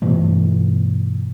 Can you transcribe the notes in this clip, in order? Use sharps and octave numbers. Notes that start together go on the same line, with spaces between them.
G2 B2 E3 A3